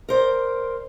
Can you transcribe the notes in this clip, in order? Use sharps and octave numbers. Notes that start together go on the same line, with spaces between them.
A#4 C5 D5